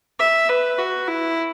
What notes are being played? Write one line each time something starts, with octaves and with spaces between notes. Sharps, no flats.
E5
B4
F#4
E4